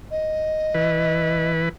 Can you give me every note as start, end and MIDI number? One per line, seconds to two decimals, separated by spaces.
0.11 1.50 75
0.74 1.69 52
0.74 1.69 71